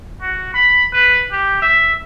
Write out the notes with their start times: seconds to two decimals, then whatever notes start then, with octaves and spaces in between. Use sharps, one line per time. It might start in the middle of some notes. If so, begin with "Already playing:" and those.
0.22 F#4
0.54 B5
0.93 B4
1.32 G4
1.62 E5